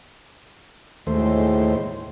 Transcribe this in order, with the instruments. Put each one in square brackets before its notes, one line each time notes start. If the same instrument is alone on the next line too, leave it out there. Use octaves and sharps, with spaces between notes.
[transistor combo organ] D#2 A3 C5 [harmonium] A2 G#3